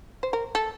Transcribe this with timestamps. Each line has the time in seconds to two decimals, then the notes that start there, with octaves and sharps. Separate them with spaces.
0.23 C5
0.33 A#4
0.55 A4